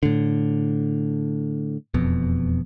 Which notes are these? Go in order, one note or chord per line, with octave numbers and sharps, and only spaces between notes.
A2 D3
E1 F2 B2